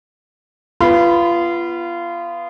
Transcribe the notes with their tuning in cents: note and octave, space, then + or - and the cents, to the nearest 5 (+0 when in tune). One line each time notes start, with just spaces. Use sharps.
B3 +0 F4 -25 B5 +0